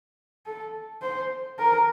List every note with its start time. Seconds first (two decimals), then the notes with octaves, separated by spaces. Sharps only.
0.46 A4
1.02 C5
1.59 A#4